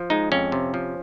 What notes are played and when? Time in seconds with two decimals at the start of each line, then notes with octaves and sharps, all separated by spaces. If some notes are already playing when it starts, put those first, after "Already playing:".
Already playing: F3
0.10 G#3 D#4
0.32 F2 C#4
0.52 C3
0.74 F3